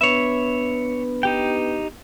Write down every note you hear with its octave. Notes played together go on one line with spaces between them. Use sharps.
B3 D4 B4 C#5 E5
D#4 G4 G5